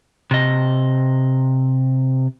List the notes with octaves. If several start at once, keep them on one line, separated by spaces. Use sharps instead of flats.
C3 D#5